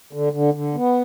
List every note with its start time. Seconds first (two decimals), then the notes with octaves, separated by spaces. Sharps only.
0.13 D3
0.33 D3
0.54 D3
0.75 B3